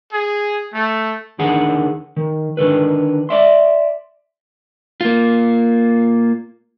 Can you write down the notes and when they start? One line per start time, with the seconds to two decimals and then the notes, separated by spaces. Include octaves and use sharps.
0.12 G#4
0.74 A3
1.38 D#2 D3 D#3 G#4 F#5
2.17 D#3
2.57 D3 D#3 A4 B4
3.29 D5 E5 C6
5.01 A#3 F4